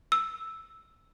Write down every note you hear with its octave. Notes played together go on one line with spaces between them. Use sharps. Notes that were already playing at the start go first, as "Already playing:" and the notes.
E6